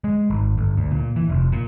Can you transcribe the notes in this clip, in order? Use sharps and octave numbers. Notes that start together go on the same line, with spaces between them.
G#3
G#1
G1
D2
A#2
E3
F1
A#2